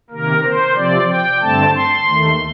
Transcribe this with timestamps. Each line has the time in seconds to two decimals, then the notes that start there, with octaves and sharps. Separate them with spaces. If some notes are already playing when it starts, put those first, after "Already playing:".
0.10 C3 D#3 A#3 A#4
0.44 C5
0.75 C3 F3 C4 D5
1.08 G5
1.41 G2 D3 A3 C4 A5
1.74 C6
2.06 D#2 D#3 A3